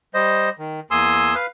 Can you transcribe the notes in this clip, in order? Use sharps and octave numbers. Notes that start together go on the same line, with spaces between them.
G3 C5 D#5
D#3
E2 A#3 G#5 C6 D#6 E6
B4 F5